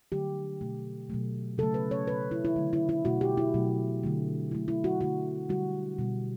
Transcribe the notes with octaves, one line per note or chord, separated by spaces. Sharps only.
D3 F#3 A3 G4
B2 A3
B2 F#3 A3
C#3 F#3 A3 A4
B4
C#5
B2 A3 B4
E4
E4
D3 F#3 A3
E4
E4
B2 A3 F#4
G4
E4
B2 F#3 A3
D3 F#3 A3
D3 F#3 A3 E4
E4
F#4
D3 A3 F#4
D3 G3 F#4
B2 G3